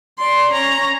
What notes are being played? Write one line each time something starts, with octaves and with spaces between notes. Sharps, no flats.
D5 C6
C#4 A#5